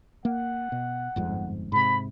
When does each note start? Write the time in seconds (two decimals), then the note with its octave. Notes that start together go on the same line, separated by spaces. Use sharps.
0.25 A#3 F#5
0.72 B2
1.16 G1 F2 G#2
1.72 G#2 C3 B5